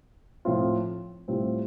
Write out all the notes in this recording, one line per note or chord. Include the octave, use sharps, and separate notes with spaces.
A2 F3 C4 F4
A2 G3 C4 F4